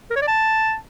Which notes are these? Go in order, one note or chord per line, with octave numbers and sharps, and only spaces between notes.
A#4
C#5
D5
A5